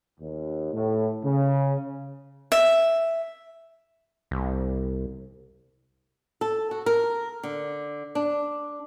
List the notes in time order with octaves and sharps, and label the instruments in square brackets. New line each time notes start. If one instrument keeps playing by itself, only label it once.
[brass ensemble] D#2
A2
C#3
[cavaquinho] E5
[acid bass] C2
[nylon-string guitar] A4
F#4
A#4
D3
D4